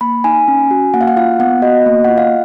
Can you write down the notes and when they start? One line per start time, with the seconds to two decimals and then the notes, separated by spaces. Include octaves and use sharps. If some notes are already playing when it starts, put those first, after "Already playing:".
0.01 A#3 B5
0.24 D#4 G#5
0.48 C#4
0.71 F#4
0.94 A#3 F#5
1.01 F5
1.08 F#5
1.16 F4 F5
1.39 B3 F#5
1.62 F#4 D#5
1.86 A#3
2.04 F4 F#5
2.18 F5